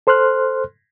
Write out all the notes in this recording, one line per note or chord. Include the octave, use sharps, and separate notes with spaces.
A4 C5 C6 F6 F#6